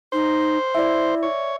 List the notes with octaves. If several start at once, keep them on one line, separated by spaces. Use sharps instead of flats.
D#4 C5
E4 D5 E5
C#5